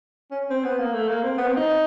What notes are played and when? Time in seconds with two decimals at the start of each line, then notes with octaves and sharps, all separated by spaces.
0.31 C#4
0.50 C4
0.64 B3
0.79 A#3
0.94 A3
1.08 A#3
1.23 C4
1.38 B3
1.48 C4
1.57 D#4